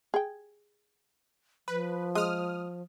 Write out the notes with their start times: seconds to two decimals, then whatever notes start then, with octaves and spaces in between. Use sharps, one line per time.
0.14 G#4 G5
1.68 F3 B4
2.15 G#3 D#6 F6